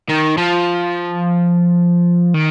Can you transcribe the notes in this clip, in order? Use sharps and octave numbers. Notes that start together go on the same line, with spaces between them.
D#3
F3
D#3